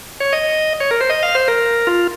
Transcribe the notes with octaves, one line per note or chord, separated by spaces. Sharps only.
C#5
D#5
C#5
A#4
C5
D#5
F5
C5
A#4
F4